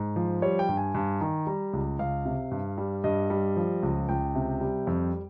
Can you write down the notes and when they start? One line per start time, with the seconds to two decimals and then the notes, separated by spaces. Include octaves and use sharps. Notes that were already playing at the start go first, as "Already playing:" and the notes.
Already playing: G#2
0.16 F3
0.42 G3 C#5
0.59 G5
0.68 G2
0.77 G#5
0.94 G2
1.21 D#3
1.47 G3 A#5
1.73 C#2
1.99 C#2 F5
2.26 C3
2.51 G2
2.78 G3
3.04 G2 D#5
3.30 G3
3.56 F3
3.83 C#2
4.09 C#2 G5
4.35 C3
4.61 G3
4.87 F2